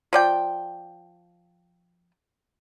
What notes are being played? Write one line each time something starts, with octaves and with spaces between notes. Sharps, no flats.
F3 D5 G5